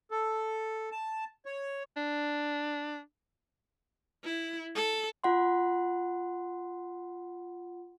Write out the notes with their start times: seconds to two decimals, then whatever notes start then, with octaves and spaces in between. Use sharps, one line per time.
0.11 A4
0.92 A5
1.45 C#5
1.97 D4
4.24 E4
4.75 A4
5.24 F4 F#5 C6